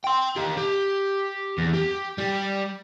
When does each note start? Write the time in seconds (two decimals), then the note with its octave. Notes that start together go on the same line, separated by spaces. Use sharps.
0.04 G5 C6
0.36 D#3 G4
0.57 G4
1.58 E2
1.74 G4
2.18 G3 G4